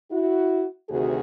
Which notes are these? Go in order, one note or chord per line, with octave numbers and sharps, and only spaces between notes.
E4 F#4
D2 C3 D#3 F#4 G#4